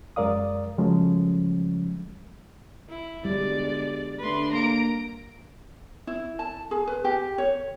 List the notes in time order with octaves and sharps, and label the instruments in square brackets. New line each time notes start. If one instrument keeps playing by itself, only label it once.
[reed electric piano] F#2 G#3 A#4 D5 F5 D#6
C#3 F3 F#3 G#3 A3 C#4
[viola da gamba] E4
[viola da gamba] B2 D3 G#3 [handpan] G3 [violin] D5
[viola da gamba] D3 D4 [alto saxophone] A3 [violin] B4 C6
[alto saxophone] A#3 [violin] A#5 D7
[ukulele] E4
A5
G#4
B4
G4
C#5